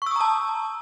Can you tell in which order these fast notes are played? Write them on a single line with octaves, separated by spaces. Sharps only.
C#6 E6 D#6 A#5 A5